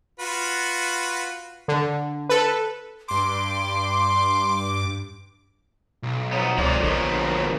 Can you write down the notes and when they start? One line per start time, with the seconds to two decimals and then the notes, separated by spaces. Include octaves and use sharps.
0.19 F4 F#4 B4
1.68 D3
2.29 A4 B4
3.08 G2 C6 D6
6.03 B1
6.33 F3 B3 C#5 D#5 A#5
6.58 C#2 F3 D#4 A4 D5 D#5
6.83 A#1 B2 D3 F3 A#4 C#5